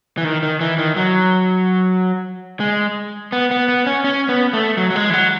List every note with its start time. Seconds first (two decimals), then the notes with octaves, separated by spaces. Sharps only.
0.17 E3
0.24 D#3
0.43 D#3
0.61 E3
0.78 D#3
0.96 F#3
2.60 G#3
3.32 B3
3.51 B3
3.68 B3
3.86 C#4
4.04 C#4
4.29 B3
4.53 A3
4.77 F#3
4.90 F#3
4.96 G#3
5.10 E3
5.13 F#3